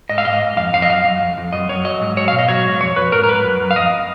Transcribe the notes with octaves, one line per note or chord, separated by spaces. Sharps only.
G#2 D#5
F5
G#2 D#5
G#2
F2 F5
F2 F5
D#5
F#2 F5
F#2
F2
F2
F#2 D#5
F#2 C#5
F#3 D#5
G#2
F#3 C#5
B2 F5
D#5
F#3 C#5
G#2
F2 C#5
F2 B4
G#2 A#4
A#4
G#2 B4
F#2
F#2
F5
F2 D#5